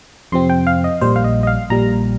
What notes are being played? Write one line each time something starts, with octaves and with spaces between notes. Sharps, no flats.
F2 C3 F3 C4 C6
G5
F5
D#5
A#1 A#2 G3 C5
F5
D#5
D#5
F5
A#1 A#2 G3 A#5